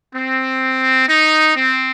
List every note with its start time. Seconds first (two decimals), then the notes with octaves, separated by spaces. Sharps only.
0.16 C4
1.09 D#4
1.55 C4